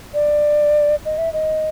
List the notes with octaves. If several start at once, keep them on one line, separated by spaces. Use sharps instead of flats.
D5
D#5
E5
D#5